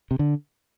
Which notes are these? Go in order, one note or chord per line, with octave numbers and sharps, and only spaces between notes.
C3
D3